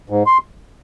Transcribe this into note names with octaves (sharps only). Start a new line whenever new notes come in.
G#2
C6